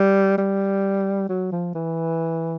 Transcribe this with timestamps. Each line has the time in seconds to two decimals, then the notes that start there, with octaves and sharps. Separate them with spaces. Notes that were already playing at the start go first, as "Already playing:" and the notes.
Already playing: G3
0.38 G3
1.29 F#3
1.52 F3
1.75 E3